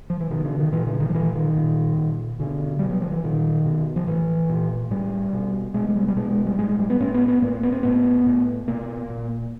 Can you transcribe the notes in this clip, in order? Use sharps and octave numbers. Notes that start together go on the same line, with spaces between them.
F3
E3
B2 D#3
D3
D#3
A#2 E3
D3
D#3
F3
A#2 E3
D#3
A#2
A#2
B2 D3
B2 G3
F#3
F3
E3
A#2 D#3
B2
F3
A2 E3
A#2
A2 G3
B2
B2 G#3
G#3
G3
G3
B2 G#3
G#3
G3
A2 G#3
G#3
G3
B3
A2 C#4
B3
B3
A2 A#3
B3
C4
A2 B3
A2
B2 A#3
A#2